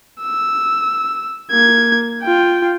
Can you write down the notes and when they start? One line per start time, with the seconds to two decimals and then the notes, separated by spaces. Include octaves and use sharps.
0.22 E6
1.51 A#3 G#6
2.23 F4 G5